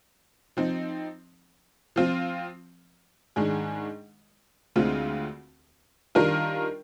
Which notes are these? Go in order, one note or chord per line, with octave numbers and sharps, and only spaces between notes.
F3 C4 D#4
F3 C4 F4
G#2 D#3 G#3 D4 G#4
D2 D3 G#3 C4 F4
D#3 G3 D4 F4 A#4